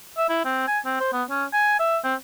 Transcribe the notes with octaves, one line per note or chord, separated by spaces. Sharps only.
E5
E4
C4
G#5
C4
C5
B3
C#4
G#5
E5
C4